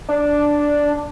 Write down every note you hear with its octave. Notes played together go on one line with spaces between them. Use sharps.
D4